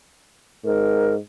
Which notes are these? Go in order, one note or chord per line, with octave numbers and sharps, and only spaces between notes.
G#2 A#4